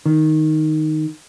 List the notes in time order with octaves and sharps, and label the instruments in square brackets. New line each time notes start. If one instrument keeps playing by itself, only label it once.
[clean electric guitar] D#3